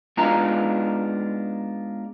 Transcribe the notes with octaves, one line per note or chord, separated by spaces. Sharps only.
G#3 B3 D4 D#4 F4 A#5